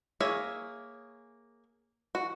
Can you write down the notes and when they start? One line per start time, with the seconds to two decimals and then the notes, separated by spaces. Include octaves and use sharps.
0.20 A#3 G#4 C#5 E5
2.15 F#4